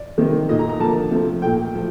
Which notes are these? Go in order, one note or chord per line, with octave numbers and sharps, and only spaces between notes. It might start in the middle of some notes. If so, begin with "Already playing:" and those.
Already playing: D5
C3 D#3 A#3
A#2 A3 D#5
A#5
A#5
D3 F3 A#3 A5
C3 F3 A3
A#2 A3 G5
F3 A3